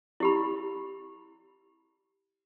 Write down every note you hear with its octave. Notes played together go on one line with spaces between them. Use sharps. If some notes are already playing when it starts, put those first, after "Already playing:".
E4 G4 B5